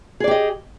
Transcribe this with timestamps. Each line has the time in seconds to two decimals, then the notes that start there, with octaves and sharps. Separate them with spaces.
0.20 G#4
0.24 D5
0.28 G4
0.31 D#5